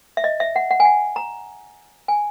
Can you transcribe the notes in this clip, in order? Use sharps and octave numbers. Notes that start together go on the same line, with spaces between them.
E5
D#5
E5
F#5
F#5
G#5
F#5
A#5
G#5